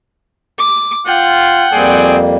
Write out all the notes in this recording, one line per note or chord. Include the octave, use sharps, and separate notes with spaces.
D6
F4 F#5 G5
F2 G3 A#3 C4 G#4 D5